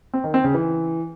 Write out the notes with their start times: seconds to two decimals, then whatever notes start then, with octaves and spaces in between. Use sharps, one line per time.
0.14 C4
0.24 D#3
0.34 C4
0.44 C#3
0.54 E3